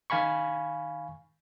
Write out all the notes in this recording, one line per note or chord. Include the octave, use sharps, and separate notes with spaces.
D#3 F5 G#5 B5 C#6